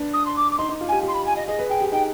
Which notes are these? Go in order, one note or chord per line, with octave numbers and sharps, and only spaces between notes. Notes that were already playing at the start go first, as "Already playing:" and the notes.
Already playing: D4 B4
D#6
C6
D6
D6
D#4 C6
D#4
F4
G4 G#5
G4 C6
B5
G#5
D#5
G#4 D#5
B4
G#4 G5
G4
D#4 G5